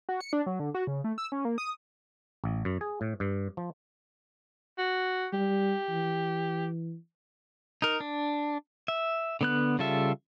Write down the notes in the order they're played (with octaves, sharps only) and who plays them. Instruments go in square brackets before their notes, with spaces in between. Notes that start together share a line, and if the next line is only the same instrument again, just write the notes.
[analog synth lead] F#4
C#7
D4
F#3
D3
F#4
C#3
A3
E6
C#4
A#3
D#6
[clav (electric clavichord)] A1
F#2
G#4
A2
G2
F3
[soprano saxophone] F#4
[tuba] G3 [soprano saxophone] G4
[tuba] E3
[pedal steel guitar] D#4 A#4
D4
E5
D3 B3 F#6
C#3 G3 F4 A4 E5